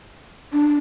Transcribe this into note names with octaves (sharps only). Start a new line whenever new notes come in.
D4